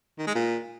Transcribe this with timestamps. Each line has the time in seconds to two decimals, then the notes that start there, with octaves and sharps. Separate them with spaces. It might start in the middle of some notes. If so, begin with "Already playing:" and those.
0.18 D#3
0.27 G#3
0.35 A#2